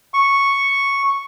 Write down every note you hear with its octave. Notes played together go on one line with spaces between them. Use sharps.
C#6